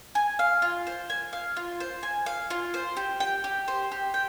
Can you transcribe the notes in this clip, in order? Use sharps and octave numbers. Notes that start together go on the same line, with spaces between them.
G#5
F5
F4
C5
G#5
F5
F4
C5
G#5
F5
F4
C5
G4
G5
G4
C5
G4
G5